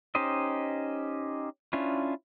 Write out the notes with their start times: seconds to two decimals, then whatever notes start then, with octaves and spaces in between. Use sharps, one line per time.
0.15 C#4 D#4 G4 C5 D#5
1.73 C#4 D4 E4 F4